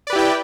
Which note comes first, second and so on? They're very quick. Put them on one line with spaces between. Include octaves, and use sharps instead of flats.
D5 B4 G4 E4 G5